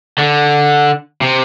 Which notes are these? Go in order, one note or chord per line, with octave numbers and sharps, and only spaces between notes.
D3
C3